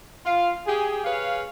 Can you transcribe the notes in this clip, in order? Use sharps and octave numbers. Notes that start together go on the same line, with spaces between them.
F4 F5
G4 G#4
G#4 B4 C#5 F5